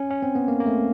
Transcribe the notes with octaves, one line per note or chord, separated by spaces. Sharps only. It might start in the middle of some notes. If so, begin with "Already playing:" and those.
Already playing: C#4
C#4
C4
B3
A#3
A#3
A3